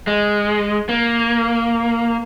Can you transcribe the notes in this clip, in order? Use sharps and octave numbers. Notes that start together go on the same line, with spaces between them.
G#3
A#3